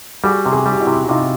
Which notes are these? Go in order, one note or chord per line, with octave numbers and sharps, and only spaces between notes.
G3 F#4 G#4
C3
F#4 G#4
G3
G4
E4 F#4
C3
F#4
C3 D#4 F4